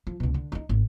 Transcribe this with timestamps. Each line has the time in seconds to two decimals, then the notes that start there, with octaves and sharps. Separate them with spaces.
0.07 F3
0.20 C#2 B2
0.34 D3
0.52 D4 D#4
0.69 G#1